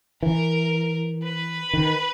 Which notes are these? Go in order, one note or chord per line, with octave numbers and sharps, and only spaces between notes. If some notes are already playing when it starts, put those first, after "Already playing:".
E3 A#4
B4
D#3